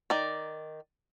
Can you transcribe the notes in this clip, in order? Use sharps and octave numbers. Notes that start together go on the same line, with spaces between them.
D#3 D5